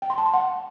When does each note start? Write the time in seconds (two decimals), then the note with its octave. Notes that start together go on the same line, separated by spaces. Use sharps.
0.02 G5
0.10 C6
0.18 A5
0.26 C6
0.34 F#5